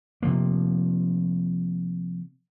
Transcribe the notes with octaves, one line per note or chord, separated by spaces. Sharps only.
C3 F3 A#3